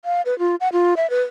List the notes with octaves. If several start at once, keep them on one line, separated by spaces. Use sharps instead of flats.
F5
B4
F4
F#5
F4
E5
B4